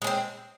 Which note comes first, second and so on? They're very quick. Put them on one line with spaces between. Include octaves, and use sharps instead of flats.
G#3 C#4 C4